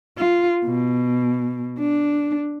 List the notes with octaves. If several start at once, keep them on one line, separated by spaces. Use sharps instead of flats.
F4
B2
D4